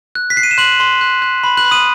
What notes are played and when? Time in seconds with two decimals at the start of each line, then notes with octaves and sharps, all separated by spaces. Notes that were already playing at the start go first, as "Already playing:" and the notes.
0.15 F#6
0.30 B6
0.36 F#6 C7
0.43 D#7
0.51 E7
0.58 C6 F#6 F#7
0.80 C6
1.01 F#6
1.22 F#6
1.44 B5
1.57 F#6 F#7
1.65 B5
1.71 D#6 D#7